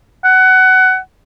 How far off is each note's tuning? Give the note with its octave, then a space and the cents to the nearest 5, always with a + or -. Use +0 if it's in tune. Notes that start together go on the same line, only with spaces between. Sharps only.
F#5 +20